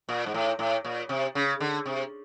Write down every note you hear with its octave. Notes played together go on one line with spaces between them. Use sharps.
A#2
G#2
A2
A2
A#2
C3
C#3
D3
C3